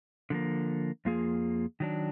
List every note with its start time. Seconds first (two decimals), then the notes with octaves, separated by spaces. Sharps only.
0.30 D3 F3 A#3
1.05 F2 F3 A#3 F4 G#4
1.80 D#3 F#3 D4